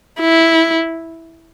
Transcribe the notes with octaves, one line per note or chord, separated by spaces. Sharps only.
E4